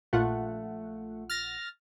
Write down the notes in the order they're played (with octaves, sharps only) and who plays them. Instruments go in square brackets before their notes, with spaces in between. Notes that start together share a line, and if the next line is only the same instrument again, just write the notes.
[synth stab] A#1 F4 F#5 [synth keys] A3
[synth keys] F6 A6 A#6